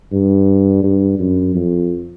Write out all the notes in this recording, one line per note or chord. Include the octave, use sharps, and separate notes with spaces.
G2
G2
F#2
F2